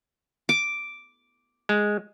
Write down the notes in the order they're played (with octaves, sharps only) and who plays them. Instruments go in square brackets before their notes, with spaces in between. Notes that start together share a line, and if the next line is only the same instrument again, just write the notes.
[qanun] D6
[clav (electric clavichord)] G#3